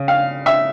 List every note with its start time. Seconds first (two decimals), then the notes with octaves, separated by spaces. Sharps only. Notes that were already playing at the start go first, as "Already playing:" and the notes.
Already playing: C#3
0.08 F5
0.46 E5